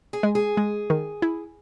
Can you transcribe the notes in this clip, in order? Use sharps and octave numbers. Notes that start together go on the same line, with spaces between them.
G#4
G#3
G#4
G#3
D#3
E4